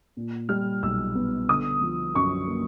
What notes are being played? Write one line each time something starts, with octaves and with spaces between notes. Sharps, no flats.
A#2
G3 F6
B1 E6
B3
D3 D#6
F3
F#2 C#6
A#3